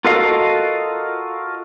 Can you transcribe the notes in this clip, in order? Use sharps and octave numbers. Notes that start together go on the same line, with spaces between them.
F4 F#4 A4 A#4 D#5 F5